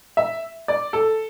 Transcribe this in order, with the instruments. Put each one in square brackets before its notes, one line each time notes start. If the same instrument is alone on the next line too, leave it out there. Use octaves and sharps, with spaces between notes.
[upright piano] E5
D5
A4